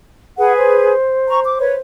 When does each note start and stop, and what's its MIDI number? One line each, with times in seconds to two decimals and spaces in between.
0.38 0.92 68
0.38 0.92 71
0.38 0.53 78
0.58 1.81 72
1.28 1.38 82
1.28 1.38 85
1.43 1.57 86
1.59 1.74 71
1.59 1.74 73